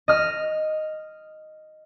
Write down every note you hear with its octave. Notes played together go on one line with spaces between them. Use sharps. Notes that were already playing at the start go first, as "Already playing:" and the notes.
D#5 F6